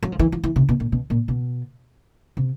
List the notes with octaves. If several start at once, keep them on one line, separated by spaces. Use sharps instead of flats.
F#3
F3
E3
F3
E3
C3
B2
A#2
B2
A#2
B2
C3